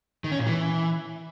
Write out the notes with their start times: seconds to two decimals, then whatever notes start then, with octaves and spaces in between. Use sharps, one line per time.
0.24 D#3
0.32 C#4
0.39 A#2
0.47 E3